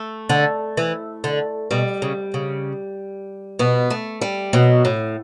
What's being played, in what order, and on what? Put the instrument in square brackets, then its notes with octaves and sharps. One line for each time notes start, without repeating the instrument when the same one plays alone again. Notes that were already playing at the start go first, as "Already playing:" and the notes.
Already playing: [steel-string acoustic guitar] A3
[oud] D3
E3
D3
[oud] B2 [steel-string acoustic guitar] G3
[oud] C#3
C#3
[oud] B2 [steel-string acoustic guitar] B3
[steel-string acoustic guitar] A3
G3
[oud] B2 [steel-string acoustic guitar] F#3
[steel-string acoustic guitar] A2